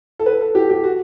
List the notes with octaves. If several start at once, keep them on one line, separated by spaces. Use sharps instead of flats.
A4
B4
A4
G4
G4
F#4